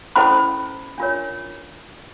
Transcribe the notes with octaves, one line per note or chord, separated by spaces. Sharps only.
C#4 E4 A4 C5 B5
D4 F4 A#4 C#5